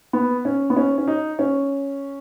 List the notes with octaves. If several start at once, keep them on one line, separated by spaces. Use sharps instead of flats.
B3
C#4
B3
C#4
C#4
D#4
C#4